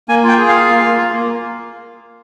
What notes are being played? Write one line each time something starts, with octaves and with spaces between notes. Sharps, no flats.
A#3 G#5
F4 G5
G#4
F4 F5
A#3
A#3
F4
A#3